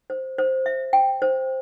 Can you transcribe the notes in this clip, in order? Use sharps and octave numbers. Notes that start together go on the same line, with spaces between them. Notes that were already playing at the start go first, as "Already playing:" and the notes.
C5
C5
E5
G5
C5